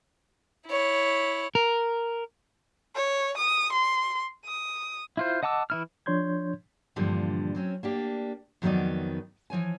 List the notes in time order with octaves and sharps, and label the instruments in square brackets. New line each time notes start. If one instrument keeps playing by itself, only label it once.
[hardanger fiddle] E4 C#5
[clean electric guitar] A#4
[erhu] C#5
D#6
C6
D#6
[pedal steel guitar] E4 F4 C5
D#5 F#5 A5 D6 E6
E3 E4 F6
[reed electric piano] F3 D4 C#5 C6 G6 G#6
[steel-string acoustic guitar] G2 A#2 D3 E3 F3 G3
F#3 C4 C#4
A#3 D4 G4
F2 D#3 F#3 B3 D#4 D5
E3 F3 C#5 G#5